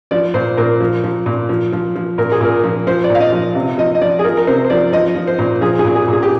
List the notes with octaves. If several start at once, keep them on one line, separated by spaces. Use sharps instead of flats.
F3 D5
A#2 C5
A#2 A#4
F3
F3
A#2
F3
F3
F3
A#2 A#4
G#4
A#2 A#4
F3
F3 C5
D5
A#2
F5
D#5
F3
C3
F3 D#5
D#5
F3 D5
G#4
F3 A#4
A#4
C3 C5
C5
F3 D5
F3 D#5
F3
C5
A#2
F3 G#4
G#4
A#2
G#4
A#2 G#4
G4